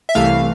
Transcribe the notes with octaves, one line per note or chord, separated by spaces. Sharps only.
E5
C2 C3 E3 A3 F5